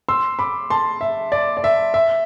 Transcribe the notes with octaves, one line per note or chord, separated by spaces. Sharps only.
C6 E6
B5 D6
A5 C6
E5
D5
D5
E5
E5